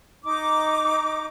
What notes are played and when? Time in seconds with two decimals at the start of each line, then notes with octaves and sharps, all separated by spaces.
0.24 D#4 D6